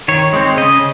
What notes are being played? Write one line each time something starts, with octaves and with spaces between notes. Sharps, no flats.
D#3 C#5
G#3 C4
C#3 D#5